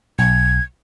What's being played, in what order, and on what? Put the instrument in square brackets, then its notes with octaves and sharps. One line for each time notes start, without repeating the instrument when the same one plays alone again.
[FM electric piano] B1 [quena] G#6